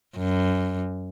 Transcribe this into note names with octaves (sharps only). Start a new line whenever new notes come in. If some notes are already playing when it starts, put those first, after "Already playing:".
F#2